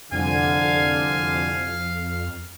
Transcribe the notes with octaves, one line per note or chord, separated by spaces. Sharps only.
C2 F2 D3 F5 G#5